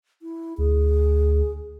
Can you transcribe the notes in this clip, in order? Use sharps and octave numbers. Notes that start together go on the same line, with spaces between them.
E4
D2 G#4